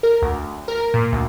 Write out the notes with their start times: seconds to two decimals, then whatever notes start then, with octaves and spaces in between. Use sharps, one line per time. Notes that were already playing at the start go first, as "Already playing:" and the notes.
0.03 A#4
0.22 D2
0.68 A#4
0.80 A#4
0.94 A#2
1.12 D2